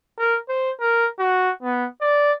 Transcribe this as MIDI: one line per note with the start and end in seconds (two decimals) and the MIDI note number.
0.18 0.38 70
0.49 0.71 72
0.80 1.07 70
1.19 1.51 66
1.62 1.86 59
2.01 2.32 74